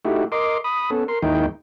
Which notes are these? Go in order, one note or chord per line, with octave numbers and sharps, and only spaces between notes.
A3 D#4 E4 F#4 G4
A#4 D#5 C6 D6
B5 D#6
B3 C#4 A4
A#4 C6
D#2 D#3 G#3 D#4 E4 G5